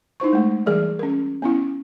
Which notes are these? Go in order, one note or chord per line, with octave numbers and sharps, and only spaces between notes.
D#4 E4 C5 C#6
G#3 A3
E3 G3 G#4 A#4 D5
C#4 A#4
B3 C#4 E4